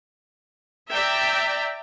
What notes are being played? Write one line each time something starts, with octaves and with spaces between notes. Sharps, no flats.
D5 E5 G5 A#5